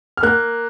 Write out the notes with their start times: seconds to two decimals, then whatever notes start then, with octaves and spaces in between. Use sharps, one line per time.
0.17 F6
0.23 A#3 F#6